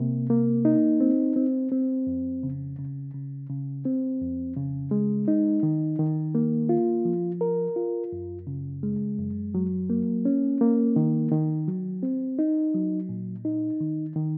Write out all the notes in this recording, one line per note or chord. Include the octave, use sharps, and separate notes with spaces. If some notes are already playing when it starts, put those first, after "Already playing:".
Already playing: C3 A#3
A#3
D#4
C4
C4
C4
F2
C#3
C#3
C#3
C#3
C4
F2
C#3
G#3
D#4
D#3
D#3
A#3
F4
F3
A#4
F4
F#2
C#3
G#3
F#2
F#3
A#3
C#4
A#3
D#3
D#3
F#3
C4
D#4
F#3
A#2
D#4
D#3
D#3